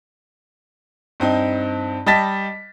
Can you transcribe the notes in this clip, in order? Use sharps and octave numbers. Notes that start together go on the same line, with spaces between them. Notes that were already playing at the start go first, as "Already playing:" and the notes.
G2 C4 D#4
G3 D#5 G5 A5 A6 B6